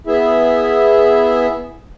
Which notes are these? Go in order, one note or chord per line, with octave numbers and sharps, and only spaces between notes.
B3 E4 G#4 E5